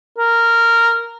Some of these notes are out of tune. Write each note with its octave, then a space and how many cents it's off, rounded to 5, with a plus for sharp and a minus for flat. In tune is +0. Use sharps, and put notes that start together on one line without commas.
A#4 -10